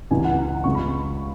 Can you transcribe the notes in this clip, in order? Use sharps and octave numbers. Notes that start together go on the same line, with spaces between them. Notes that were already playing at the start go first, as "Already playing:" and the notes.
C#2 C#3 E3 G#5
F#5
A#5
C#2 C#3 G#3 C#6
B5